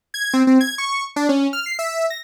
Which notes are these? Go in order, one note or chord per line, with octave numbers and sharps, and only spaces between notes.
G#6
C4
C4
G#6
C#6
D4
C#4
F6
C7
E5
A#6